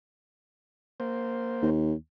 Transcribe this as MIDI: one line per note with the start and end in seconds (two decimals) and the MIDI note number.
1.00 1.70 58
1.00 1.70 72
1.63 1.94 39